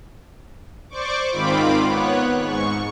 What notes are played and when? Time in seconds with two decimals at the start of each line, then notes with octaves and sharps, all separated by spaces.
0.89 C5 D5 C#6 D6
1.31 G#2 D#3 C4 F4 B5 D6
1.88 B3 C#5 F#6
2.38 G#2 C#6